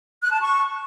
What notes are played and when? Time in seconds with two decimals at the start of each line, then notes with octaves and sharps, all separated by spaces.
0.21 F#6
0.30 A5
0.39 C#6